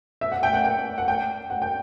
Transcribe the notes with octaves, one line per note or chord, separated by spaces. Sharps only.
E5
F#5
G5
F#5
G5
F#5
G5
F#5
G5